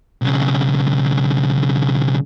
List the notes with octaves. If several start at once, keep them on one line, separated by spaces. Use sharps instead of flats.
B1 C#3